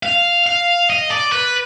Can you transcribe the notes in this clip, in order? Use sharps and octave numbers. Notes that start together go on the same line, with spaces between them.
F5
F5
D#5
D5
B4